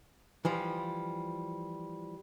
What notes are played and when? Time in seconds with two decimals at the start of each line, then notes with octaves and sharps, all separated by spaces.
0.45 E3 F3 G3